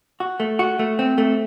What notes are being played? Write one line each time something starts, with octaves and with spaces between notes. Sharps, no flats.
F#4
A3
F#4
A3
C4
A3